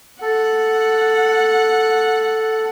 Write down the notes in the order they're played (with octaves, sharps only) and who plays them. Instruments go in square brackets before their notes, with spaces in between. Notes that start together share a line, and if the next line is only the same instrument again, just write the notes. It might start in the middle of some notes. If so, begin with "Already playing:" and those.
[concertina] A4 [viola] F#5